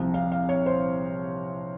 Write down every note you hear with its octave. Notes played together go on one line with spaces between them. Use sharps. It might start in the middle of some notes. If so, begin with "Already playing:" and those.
Already playing: C2 C3 F3
F5
F5
C#5
C5